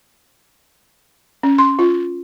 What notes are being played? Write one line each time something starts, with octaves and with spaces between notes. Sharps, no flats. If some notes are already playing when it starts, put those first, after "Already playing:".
C#4
C6
F4